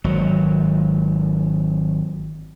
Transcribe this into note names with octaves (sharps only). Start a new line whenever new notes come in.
G#1 F#3